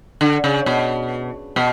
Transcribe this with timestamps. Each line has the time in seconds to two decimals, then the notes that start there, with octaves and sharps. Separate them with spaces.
0.21 D3
0.44 C#3
0.66 B2
1.56 B2